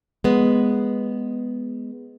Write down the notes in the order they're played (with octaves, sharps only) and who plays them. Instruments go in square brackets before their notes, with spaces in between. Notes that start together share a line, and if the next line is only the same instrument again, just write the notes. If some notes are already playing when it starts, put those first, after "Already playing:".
[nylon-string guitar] G#3 B3